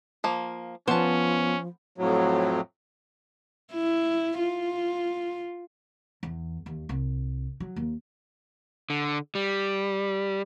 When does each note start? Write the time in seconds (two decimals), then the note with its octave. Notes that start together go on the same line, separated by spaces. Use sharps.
0.24 F3 A#3
0.88 F3 B3 C#4 C5 A5
1.98 F2 A2 F#3
3.74 E4
4.39 F4
6.23 E2
6.66 D#2
6.89 C2
7.60 F#3
7.76 D#2
8.90 D3
9.35 G3